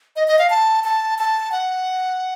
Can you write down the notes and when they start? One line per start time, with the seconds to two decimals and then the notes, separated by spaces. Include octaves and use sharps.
0.16 D#5
0.28 D#5
0.39 F5
0.50 A5
0.84 A5
1.18 A5
1.52 F#5